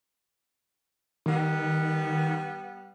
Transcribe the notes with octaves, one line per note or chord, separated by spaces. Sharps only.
D#3 G3 B3 F#5